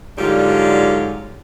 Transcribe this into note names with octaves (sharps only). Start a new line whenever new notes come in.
G#2 D3 F#3 G3 F4